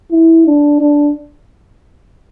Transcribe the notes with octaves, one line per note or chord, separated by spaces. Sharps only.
E4
D4
D4